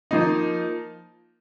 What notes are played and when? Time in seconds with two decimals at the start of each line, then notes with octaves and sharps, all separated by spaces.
0.11 F3 A#3 D#4